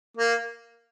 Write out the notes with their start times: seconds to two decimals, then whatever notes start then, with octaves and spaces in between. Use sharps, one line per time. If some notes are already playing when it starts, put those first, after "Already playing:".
0.17 A#3